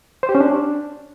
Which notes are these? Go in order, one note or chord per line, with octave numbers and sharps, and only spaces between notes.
C5
G4
C#4
D4